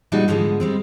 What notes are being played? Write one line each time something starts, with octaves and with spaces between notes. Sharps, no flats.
A#2 G3 G#3 D4 D#4 F#4
G#2 D3 E3 F3 G#3 B3
G3 G#3 C4